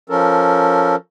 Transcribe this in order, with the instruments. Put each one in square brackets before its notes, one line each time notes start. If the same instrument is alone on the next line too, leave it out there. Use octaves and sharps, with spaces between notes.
[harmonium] F3 C#4 A4 A#4